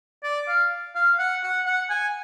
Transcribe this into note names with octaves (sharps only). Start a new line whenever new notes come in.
D5
F5
F5
F#5
F#5
F#5
G#5